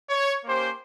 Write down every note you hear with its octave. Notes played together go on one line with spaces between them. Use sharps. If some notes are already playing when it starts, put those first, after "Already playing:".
C#5
A#3 C#4 G4 C5